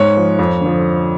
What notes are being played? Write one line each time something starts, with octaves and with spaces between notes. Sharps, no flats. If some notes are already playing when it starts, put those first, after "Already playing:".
Already playing: G#2 C#5
F3
F2
D3 F3